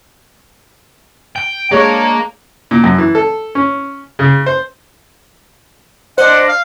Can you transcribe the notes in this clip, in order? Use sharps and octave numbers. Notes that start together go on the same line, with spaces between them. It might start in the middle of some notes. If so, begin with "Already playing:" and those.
G5
G#3 A#3 D4 C#5
A#2
F#2
E3
A4
C#4
C#3
C5
D4 C5 D#5 F#5
F5